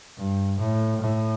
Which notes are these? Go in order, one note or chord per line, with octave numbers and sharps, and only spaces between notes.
G2
A2
A2